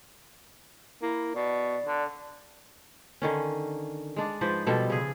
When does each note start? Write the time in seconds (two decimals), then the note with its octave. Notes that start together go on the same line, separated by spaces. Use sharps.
1.02 A#3 E4
1.35 B2 D5
1.86 D3
3.22 D3 D#3 C#4
4.16 G#3 D4
4.41 G#2 F3 B4 C5
4.66 B2 F3 G3 A4
4.90 C#3 G#4